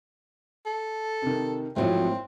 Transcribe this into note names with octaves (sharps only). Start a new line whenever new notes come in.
A4
C3 D#3
G#1 F3 F#3 A3 C4 E4 C#5